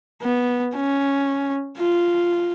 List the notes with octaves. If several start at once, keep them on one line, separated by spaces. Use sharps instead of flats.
B3
C#4
F4